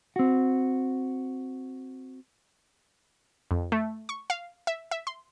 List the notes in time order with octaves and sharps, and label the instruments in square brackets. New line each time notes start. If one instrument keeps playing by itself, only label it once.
[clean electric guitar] C4 F#4
[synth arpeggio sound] F2
A3
C#6
F5
E5
E5
C6